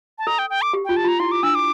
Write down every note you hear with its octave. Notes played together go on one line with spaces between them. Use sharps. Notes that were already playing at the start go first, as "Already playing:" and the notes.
A5
A4 A#5
G5
G5
D6
G4
F4 G5
A5
F4
A#5
E4 C6
D6
D4 E6
D6